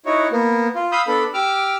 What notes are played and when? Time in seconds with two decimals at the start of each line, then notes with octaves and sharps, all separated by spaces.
0.06 D#4 E4 F#4 C#5
0.32 A#3 B3
0.75 F4
0.92 F5 B5 D#6 E6 G6
1.07 B3 D4 A4 B5
1.34 G4 D6 E6 F6